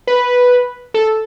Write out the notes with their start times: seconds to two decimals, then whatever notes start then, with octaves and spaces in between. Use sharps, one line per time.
0.07 B4
0.94 A4